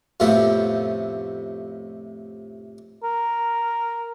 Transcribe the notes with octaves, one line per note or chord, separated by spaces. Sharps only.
F2 A2 C3 F3 A3 B3
A#4